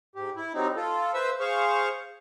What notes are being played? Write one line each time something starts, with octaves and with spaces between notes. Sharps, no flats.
G#2 G4
E4
F#3 G3 C4 D#4
F4 A4
B4 C5 E5 E6
G#4 C5 F5 C#6